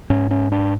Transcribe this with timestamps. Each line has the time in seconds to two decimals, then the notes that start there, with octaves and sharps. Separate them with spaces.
0.10 G#2 C#4
0.31 C#4
0.52 D4